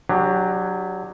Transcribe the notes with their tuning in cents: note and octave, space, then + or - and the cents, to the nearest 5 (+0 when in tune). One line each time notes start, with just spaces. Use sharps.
F#3 +0 D4 +25 G4 +25